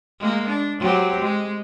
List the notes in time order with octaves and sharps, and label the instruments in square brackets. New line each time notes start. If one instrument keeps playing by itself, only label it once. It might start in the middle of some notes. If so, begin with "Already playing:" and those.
[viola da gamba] G#3 A#3
D4
F#3 C4 G4
G#3